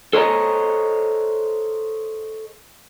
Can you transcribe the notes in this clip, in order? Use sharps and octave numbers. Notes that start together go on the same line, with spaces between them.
A4 C5 C#5 D#5 F#5 A#5